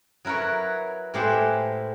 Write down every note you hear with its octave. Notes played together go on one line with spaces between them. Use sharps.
F#3 E4 A#4 B4 C#5
A2 G#3 G4 C5 E5 F#5